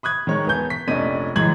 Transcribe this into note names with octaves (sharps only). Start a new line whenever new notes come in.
B5 D#6 F#6 G#6
D#3 G#3 C#5
E1 B3 G#5 G6
B6
F1 A#1 C#4 D4 D#5 D#7
C#2 F#2 E3 G#6 F#7